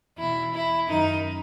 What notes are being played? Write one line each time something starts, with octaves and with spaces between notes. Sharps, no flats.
E2 B2 E4
E4
F#2 D#3 D#4